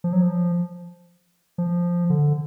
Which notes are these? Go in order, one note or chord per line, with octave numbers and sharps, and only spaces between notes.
F3
F#3
F3
F3
D3